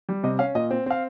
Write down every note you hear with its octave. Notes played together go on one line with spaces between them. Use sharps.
G3
C3 D#5
C#4 F5
A#2 D#5
C4
C4 F5